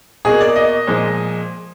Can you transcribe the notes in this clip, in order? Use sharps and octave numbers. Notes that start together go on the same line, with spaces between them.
B2 A#3 G#4
D5
D#5
A#2 F3 G#3